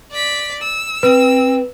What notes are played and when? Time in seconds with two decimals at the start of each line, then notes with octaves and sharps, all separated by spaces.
0.12 D5 B6
0.62 E6
1.03 C4 B4